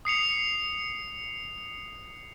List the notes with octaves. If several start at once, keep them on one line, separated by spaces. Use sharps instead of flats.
D#6 C7 C#7 F7